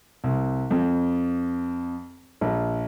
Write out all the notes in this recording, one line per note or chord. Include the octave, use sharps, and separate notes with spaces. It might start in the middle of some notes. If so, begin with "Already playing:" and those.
C2
F2
A#1